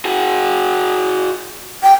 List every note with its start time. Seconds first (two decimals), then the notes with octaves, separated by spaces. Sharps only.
0.05 F#4 G#4
1.83 G5